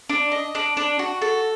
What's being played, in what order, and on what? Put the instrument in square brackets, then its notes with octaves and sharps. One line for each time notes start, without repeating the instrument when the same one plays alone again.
[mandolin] D4
D#5
D4
D4
F#4
A4